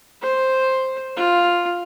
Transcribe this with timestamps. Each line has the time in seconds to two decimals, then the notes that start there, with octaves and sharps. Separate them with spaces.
0.22 C5
1.16 F4